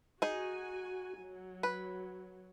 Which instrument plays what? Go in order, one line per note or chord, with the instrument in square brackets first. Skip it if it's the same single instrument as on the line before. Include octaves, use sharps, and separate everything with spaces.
[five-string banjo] D#4 G#4 [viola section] F#4 G#5
[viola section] F#3
[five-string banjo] B4